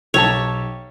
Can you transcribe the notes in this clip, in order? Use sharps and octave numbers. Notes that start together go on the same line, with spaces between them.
B1 G4 C#5 A5